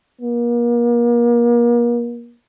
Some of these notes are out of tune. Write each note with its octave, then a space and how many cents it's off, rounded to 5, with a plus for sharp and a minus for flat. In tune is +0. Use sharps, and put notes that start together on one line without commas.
A#3 +35